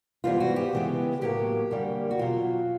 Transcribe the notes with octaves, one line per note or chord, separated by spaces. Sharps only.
G#2 E3 G3 B3 F4
F#4
G4
C#3 E3 G#3 B3
A2 F#3 A#3 G4
F#2 D3 G3 A#3
F#4
E2 B2 F#3 F4